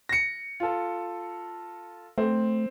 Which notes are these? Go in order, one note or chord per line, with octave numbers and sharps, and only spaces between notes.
A#6 C#7
F4 A4
A3 C4